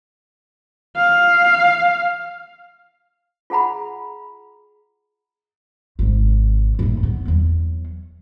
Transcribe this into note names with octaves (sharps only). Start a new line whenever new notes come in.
F5
F4 G#4 F#5 A#5 B5
G#1 C3
F#1 A2
B3
E2 F#3